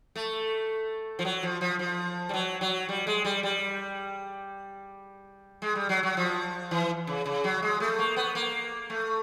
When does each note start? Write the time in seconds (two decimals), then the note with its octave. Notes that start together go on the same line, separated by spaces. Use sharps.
0.16 A3
1.19 F3
1.25 F#3
1.43 F3
1.61 F3
1.79 F3
2.29 G3
2.34 F#3
2.61 F#3
2.89 G3
3.07 G#3
3.25 G3
3.43 G3
5.62 G#3
5.75 G3
5.89 F#3
6.03 F#3
6.17 F3
6.71 E3
7.07 C#3
7.26 C#3
7.44 F#3
7.63 G#3
7.80 A3
7.99 A#3
8.16 B3
8.35 A#3
8.90 A3